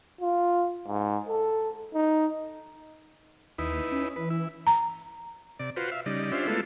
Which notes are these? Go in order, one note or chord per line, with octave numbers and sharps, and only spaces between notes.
F4
G#2
A4
D#4
D#2 D#4 E4 B4
C#4
E3 B4
E4
A#5
C3 D5
F4 F#4 B4 C5
E5 F5
C#3 G3 D#4 D5
C#4 D4 F4 G4 C5 E5
G#3 A3 B3 E4 F4 A4